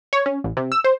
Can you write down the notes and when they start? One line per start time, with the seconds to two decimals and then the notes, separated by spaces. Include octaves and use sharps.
0.13 C#5
0.26 C#4
0.44 A1
0.57 C3
0.72 E6
0.84 C5